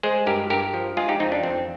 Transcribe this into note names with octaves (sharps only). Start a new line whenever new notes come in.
G#3 G#4 C5
G2 G4 A#4
G2 G4 A#4
F3
G#3 F4 G#4
D#4 G4
F2 C4 D#4
D4
F2 C4